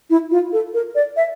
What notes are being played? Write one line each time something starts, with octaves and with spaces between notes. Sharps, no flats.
E4
F4
A4
A#4
D5
E5